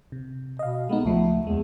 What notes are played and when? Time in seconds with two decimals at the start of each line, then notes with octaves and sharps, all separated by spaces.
0.12 C3
0.59 B2 D#5 F5
0.89 G#3 A3 B3 D#4
1.05 C#2 F3 A3
1.47 E2 G#3